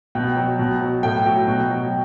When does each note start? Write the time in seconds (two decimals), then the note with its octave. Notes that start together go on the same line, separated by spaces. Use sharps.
0.15 B2 G5
0.37 F#3
0.59 B2
0.81 F#3
1.03 A2 G5
1.26 F#3
1.48 B2
1.70 F#3